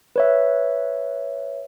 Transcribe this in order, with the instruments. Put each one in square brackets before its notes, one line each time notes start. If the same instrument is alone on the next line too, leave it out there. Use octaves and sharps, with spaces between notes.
[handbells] B4 C#5 E5